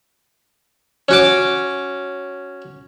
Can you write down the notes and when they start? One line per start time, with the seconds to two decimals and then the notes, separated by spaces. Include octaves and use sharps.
1.09 C#4 F#4 D6